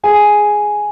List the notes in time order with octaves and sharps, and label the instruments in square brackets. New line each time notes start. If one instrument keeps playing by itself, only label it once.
[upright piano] G#4 G#5